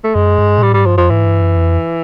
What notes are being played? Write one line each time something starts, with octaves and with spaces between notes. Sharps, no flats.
A3
F#2 G#3
G2
A#2
A2 G3
G#2 G3
G2 F3
F2 F3
G#2 E3
G2
F#2
F2